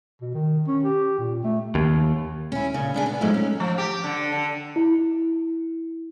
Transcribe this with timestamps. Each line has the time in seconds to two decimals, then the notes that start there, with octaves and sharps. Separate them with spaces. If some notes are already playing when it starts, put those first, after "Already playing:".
0.21 B2
0.34 D#3
0.67 C#4
0.83 G4
1.19 A#2
1.44 A3
1.75 D#2
2.52 C#4 E4
2.74 A#2 C#3
2.94 B3 D4 G#4
3.06 B3
3.21 G#2 F3 F#3 G#3 A3
3.34 C#4
3.60 F3
3.78 G4
4.04 D3
4.32 D3
4.76 E4